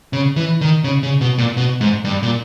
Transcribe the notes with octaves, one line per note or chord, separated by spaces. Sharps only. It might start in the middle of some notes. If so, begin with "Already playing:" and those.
C#3
E3
D#3
C#3
C#3
B2
A#2
B2
G#2
G2
A#2